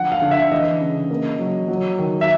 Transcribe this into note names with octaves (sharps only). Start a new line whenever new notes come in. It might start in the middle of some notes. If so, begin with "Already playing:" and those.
Already playing: D3 F3 F#5
F5
D3
E5
E3 D#5
C#3
A#3
F#3
F#3
D#3
E5